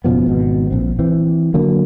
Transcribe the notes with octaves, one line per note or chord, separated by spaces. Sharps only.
F#1 B2 F3 B3
G#1 B2
A#1 C4
E3 C4
D3 F#3 A#3